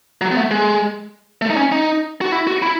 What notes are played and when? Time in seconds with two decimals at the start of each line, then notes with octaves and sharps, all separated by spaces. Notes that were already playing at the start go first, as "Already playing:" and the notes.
0.21 F#3
0.32 B3
0.37 A3
0.51 G#3
1.42 A3
1.50 D#4
1.57 C#4
1.72 D#4
2.21 F#4
2.32 E4
2.47 F#4
2.62 E4